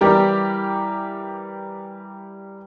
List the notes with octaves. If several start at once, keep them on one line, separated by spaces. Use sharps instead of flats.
E3 G3 G4 A#4